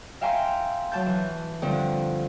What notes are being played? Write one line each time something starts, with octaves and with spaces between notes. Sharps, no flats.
E5 F5 G5 G#5 A#5 C6
F#3 A5 G6
E3
G2 D3 F3 C4